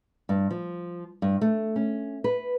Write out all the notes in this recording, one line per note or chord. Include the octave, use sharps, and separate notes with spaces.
G2
F3
G2
A3
C#4
B4